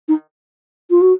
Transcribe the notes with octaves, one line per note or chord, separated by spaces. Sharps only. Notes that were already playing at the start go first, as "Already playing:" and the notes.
D#4
F4
F#4